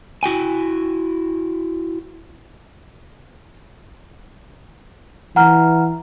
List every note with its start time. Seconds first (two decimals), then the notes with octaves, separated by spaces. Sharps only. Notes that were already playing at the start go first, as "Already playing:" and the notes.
0.23 E4 F#4 G5 G#5
5.36 E3 F#5 A#5 F6